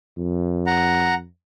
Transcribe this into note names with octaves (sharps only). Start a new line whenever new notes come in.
F2
F#5 A#5